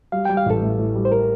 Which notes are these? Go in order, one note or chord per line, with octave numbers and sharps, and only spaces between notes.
G3 F5
G3 G5
F5
A1 A4
A2
A2
G3
C5
A#4